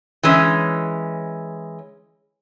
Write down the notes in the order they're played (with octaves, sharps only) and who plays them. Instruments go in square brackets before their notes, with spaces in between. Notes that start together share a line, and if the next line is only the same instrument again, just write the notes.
[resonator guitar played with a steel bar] E3 G#3 C#4